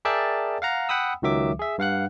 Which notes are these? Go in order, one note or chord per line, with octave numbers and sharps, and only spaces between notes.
G#4 A#4 D5 E5 G5 A5
F5 F#5 A#5
F#5 G5 B5 D#6 E6
C#2 D#3 F#3 E5 D6
G#4 E5
G2 F5 F#5 F#6